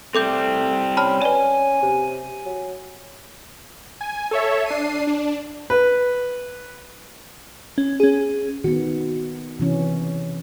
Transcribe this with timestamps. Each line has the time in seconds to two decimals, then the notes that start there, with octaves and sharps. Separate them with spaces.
0.15 G3 A3 C4 A4 D6 G6
0.97 C#4 A5 B5 F6
1.22 B4 D5 G#5
1.82 C3
2.45 F#3
4.01 G#5
4.31 A4 C#5 E5
4.66 D4 C7 D#7
5.07 D4
5.70 B4
7.78 C#4
8.00 C#4 G#4
8.64 D#3 B3 F#4
9.60 C3 E3 C#4